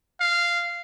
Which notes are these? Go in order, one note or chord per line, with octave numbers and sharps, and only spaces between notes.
F5